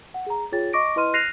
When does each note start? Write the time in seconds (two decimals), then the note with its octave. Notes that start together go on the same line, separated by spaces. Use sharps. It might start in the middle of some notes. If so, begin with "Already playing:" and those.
0.14 F#5
0.27 G#4 A#5
0.52 F4 G#4 C#5 G5 A6
0.73 D#5 C#6 D6 A#6 D7
0.96 E4 B4 D#5 C6 F6 D#7
1.13 F6 F#6 A#6 C7 D#7 F7